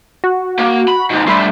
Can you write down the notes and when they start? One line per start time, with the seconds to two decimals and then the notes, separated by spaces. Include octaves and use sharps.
0.24 F#4
0.59 A#3
0.88 B5
1.11 D#2 G#2
1.27 G2 A3 B5 C6